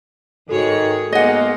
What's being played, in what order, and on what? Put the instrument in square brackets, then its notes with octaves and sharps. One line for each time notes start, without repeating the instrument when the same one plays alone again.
[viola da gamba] G#2 G#4 C#5 [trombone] D#3 [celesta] F#4 A4
[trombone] G#3 [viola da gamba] A#3 B3 D#4 [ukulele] D#5 F#5